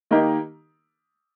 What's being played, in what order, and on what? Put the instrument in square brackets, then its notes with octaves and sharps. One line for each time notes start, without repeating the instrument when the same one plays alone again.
[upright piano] D#3 A#3 D#4 G4 A#4